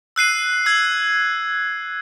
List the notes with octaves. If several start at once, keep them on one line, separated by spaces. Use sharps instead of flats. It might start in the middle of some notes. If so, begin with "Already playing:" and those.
E6 F#6 C7 D#7
E6 G#6